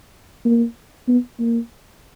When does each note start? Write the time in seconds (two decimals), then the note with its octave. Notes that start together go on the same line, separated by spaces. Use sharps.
0.45 A#3
1.08 B3
1.39 A#3